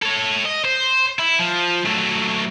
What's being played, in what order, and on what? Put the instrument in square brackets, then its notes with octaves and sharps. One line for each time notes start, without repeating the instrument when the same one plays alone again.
[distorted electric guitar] A4 C#5
D#5
C5
E4
F3
F#3 A3